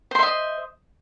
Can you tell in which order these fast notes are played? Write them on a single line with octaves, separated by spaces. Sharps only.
C5 C6 E5 D#5